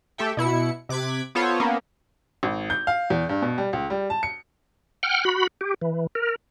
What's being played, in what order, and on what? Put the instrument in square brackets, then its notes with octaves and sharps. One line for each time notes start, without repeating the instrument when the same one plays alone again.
[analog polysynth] A3 G4 A4 E5 G5
B2 E4 C#7
C3 D6 F#6 G#6 B6
B3 F4 A4 C5 C#5
A#3 B3 C#4
[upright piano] G#1
G6
F5
E2
G2
B2
G3
C#2
G3
A5
C#7
[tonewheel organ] F#5 G5 F6
F#4 B5
G4
E3
A#4